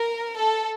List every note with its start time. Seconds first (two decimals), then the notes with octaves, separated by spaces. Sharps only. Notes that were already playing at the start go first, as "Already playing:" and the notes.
Already playing: A#4
0.37 A4